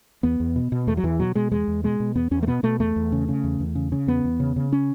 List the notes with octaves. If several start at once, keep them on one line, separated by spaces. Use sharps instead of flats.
E2 B3
E2
B2
B2
E2 A3
F#3
E2 E3
B2 F#3
B2 G#3
E2 G#3
E2
B2 G#3
B2
E2 B3
E2 C#4
A3
B2 B3
B2 A3
E2 A3
E2
C#3
C#3
E2
E2
C#3
C#3
E2 B3
E2
C#3
C#3
C#4